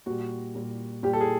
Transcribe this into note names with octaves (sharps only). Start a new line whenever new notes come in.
A#2 G3 F#4
A#2 G3
A#2 G3 G4
A4
G#4